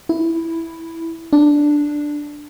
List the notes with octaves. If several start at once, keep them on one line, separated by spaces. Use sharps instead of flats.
E4
D4